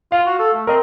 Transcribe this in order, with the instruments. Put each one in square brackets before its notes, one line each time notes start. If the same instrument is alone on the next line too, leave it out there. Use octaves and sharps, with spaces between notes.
[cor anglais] F4 [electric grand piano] F5
[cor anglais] F#4
A4
A3
[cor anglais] C4 [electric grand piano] A#4 D#5